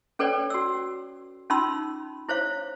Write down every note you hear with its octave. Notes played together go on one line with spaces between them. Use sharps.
C#4 A4 B4 C#5 D5 G5
F#4 E6
C#4 D#4 F4 B5 C6 E6
E4 C5 C#5 F5